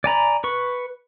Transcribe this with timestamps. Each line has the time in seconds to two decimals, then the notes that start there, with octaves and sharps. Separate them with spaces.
0.04 D5 G#5 A#5 B5
0.44 B4 C#6